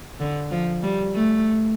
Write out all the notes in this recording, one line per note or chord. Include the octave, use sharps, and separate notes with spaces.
D3
F3
G3
A3